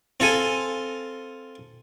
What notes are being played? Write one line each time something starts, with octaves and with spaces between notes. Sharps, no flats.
C4 F4 A4 G#5